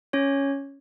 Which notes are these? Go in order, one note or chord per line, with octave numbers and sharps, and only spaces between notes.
C#4 C#5